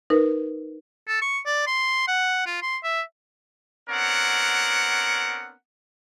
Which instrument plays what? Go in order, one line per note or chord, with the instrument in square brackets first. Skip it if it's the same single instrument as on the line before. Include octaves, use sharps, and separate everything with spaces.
[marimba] D#4 A#4 B4
[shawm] A4
C#6
D5
C6
F#5
F4
C6
E5
[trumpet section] B3 C4 D4 A#4 C#5 F#5